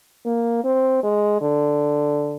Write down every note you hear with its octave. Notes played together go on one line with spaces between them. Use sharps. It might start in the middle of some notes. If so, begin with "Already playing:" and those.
A#3
C4
G#3
D3